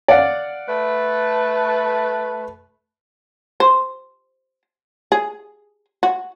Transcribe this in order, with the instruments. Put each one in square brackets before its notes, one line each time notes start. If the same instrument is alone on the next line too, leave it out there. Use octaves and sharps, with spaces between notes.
[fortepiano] D5 F5 F#5
[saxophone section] A3 B4
[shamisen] C5
G#4
F#4